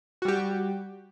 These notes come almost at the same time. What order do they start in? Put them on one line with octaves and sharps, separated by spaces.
F#4 G3 G4